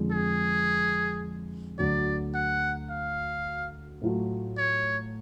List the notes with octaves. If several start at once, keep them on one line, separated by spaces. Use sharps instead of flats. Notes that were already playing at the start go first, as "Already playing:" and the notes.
Already playing: F2 D3 F3 G#3 D4
G#4
D2 D3 F#3 D5
F#5
F5
A2 F#3 A3 F4 A4
C#5